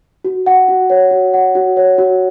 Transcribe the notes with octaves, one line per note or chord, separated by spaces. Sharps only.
F#4
F#5
F#4
C#5
F#4
F#5
F#4
C#5
F#4